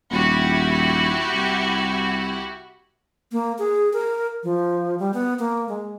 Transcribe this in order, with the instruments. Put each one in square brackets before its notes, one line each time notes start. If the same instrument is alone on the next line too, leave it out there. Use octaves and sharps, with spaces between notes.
[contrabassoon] D#1 [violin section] E4 F#4 G4
[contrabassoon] C2
[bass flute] A#3
G#4
A#4
F3
G3
B3
A#3
G#3